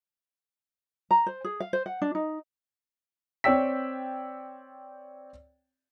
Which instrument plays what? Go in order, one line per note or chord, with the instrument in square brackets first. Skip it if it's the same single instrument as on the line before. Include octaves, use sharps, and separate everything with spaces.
[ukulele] A#5
C5
G#4
F5
C5
F#5
D4
D#4
[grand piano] C4 C#5 D5 G5 E6 B6